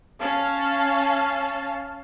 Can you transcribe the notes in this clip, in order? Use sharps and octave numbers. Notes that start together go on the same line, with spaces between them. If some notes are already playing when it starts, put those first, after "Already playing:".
C#4 F5 A5